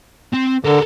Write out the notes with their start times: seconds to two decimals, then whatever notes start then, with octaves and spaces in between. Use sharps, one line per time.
0.33 C4
0.65 D3 A4 A#4